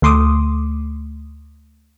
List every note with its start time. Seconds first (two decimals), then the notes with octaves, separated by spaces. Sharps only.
0.02 D2 A3 C6 D6 D#6